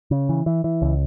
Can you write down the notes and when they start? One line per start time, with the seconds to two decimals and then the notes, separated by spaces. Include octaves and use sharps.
0.11 C#3
0.29 E3
0.46 E3
0.64 E3
0.82 C#2